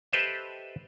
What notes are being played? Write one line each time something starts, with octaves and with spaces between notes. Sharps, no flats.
G4 A4 B4 C5 D#5 E5